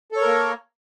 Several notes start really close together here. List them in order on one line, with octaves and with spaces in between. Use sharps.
A4 C#5 A#4 A#3